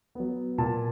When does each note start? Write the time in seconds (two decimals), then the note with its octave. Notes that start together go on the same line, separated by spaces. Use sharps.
0.15 F#3 B3
0.58 A#2 A5